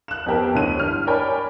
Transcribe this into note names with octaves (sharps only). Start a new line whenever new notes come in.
F#6 E7
F2 B3 G4 A#4
D2 E4 C#5 F#6 D#7
G2 F6
A#4 C#5 D5 G5 G#5 B5